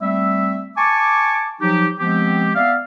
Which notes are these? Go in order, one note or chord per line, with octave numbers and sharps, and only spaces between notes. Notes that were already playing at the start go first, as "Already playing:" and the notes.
G3 A3 C4 E5
G#5 A5 C#6 D6
F3 F#3 D#4 G4
F3 G#3 B3 C4 G4
B3 D5 E5 F5